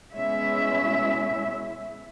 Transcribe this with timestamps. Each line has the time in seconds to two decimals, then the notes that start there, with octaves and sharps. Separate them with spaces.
0.14 B2 G#3 C#4 E4 E5